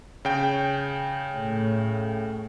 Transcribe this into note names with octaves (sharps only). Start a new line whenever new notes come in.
C#3 G5
A2